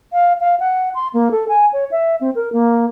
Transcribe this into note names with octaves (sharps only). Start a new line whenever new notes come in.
F5
F5
F#5
C6
A#3
A4
G#5
C#5
E5
C4
A#4
A#3